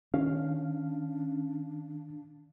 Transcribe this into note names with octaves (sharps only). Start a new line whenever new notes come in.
D#3 C#4 D4 F5